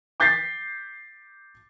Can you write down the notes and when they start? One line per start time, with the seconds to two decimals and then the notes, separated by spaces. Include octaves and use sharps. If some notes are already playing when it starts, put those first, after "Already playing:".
0.20 D6 G6 A6 B6 C7